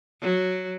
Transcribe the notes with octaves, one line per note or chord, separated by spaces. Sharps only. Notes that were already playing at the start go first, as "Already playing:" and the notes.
F#3